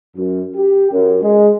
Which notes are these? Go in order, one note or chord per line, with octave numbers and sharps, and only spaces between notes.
F#2
G4
F#2
G#3